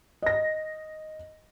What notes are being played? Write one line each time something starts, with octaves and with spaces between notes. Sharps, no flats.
D#5 A#6